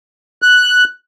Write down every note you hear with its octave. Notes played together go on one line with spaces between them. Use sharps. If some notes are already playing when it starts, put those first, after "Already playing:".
F#6